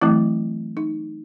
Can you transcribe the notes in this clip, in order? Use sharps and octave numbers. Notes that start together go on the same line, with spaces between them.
E3 F#3 A3 C4 E4
D#4